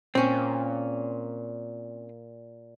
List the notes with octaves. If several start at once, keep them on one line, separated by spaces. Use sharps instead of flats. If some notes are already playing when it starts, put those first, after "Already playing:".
A#2 C4 C#4